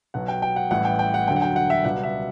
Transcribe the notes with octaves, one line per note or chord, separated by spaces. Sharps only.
B1 B2 F#3 F#5
G5
G5
F#5
A1 A2 E3 G3 F#5
G5
G5
F#5
E1 D2 D3 F#3 G5
F#5
G5
F#5
E5
C#2 B2 G3 F#5
E5